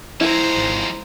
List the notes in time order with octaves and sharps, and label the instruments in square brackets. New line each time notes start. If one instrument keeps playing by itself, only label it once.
[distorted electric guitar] F3 G#3 [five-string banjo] E4 [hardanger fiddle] C5 A#5
[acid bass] G#1